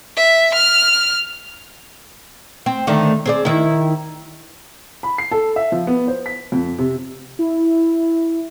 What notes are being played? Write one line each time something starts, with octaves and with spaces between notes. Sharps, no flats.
E5
F6
C4
D3 D#3 A3
C4 G#4 D5
D#3 E4
B5
C7
A4
E5
F3
B3
C5
B6
F2
C3
E4